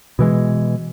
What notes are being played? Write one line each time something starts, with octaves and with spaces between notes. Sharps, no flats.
B2 E3 G#3